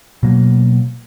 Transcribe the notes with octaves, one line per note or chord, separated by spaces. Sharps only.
B2 F#3 A#3